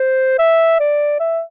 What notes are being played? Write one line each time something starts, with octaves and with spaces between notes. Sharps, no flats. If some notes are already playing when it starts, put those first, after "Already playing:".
Already playing: C5
E5
D5
E5